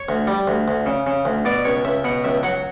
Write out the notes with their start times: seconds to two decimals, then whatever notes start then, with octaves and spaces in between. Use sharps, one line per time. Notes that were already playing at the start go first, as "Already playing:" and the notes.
Already playing: C#5
0.09 D2
0.27 G3
0.47 D2
0.68 D2
0.86 C#3
1.07 C#3
1.25 D2
1.45 B2 D5
1.65 C#2 C#5
1.85 C#2 E5
2.04 B2 F#5
2.24 C#2 E5
2.43 F#3 F#5